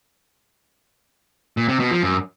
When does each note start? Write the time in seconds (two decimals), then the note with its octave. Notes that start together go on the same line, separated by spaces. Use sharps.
1.57 A#2
1.68 C3
1.80 B2
1.91 F3
2.02 F#2